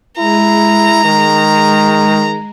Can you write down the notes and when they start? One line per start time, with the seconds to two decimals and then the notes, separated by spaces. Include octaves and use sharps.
0.18 G#3 E4 A#5
1.05 D#3